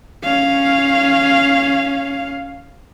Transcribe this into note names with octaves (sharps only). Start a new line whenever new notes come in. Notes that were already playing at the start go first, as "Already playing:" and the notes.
C#4 F5